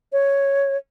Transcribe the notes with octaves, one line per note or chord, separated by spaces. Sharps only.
C#5